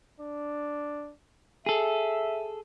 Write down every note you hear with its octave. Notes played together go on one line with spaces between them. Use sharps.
D4
G#4 A4 E5